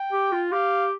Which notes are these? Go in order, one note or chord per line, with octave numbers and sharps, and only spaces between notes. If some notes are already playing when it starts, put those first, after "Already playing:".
Already playing: G5
G4
F4
G4 F5